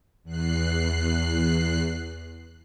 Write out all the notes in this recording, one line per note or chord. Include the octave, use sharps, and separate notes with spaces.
E2 F#6 C7